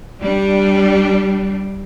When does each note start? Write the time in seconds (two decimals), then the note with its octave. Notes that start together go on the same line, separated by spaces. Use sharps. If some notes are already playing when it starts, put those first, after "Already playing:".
0.21 G3 D4